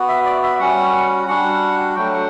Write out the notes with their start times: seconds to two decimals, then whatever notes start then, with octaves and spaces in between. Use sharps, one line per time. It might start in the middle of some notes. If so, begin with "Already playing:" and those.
Already playing: B3 F#4
0.08 E5
0.26 D5
0.43 E5
0.60 G3 C#4 F#4 F#5
1.27 G3 D4 F#4 F#5
1.96 F#3 A3 D4 G5
2.14 F#5